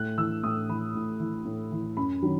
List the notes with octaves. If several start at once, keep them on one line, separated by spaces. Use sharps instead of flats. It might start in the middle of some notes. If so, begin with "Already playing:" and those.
Already playing: A2 F#6
E3 E6
A2 D#6
E3 B5
A2
E3
A2
E3
F#2 B5
D#3 F#3